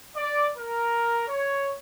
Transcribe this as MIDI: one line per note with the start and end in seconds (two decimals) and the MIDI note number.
0.16 0.48 74
0.58 1.23 70
1.28 1.75 73